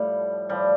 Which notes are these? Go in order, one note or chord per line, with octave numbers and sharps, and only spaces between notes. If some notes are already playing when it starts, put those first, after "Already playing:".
Already playing: A2 F3 G3
A2 F3 G3